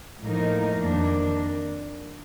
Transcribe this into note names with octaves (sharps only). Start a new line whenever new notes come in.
A2 F3 A#3 D#4 A#4
F2 D#3 A#3 D4